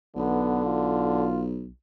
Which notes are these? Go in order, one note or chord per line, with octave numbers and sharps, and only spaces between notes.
B1 D3 B3
F4